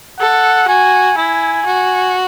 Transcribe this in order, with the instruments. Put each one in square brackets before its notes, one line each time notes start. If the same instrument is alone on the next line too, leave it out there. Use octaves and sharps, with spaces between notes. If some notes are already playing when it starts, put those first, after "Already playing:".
[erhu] A4 [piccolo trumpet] F#5
[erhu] F#4 [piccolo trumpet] G#5
[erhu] E4 [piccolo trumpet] G#5
[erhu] F#4